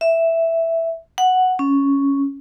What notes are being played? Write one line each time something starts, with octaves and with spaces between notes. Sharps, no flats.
E5
F#5
C#4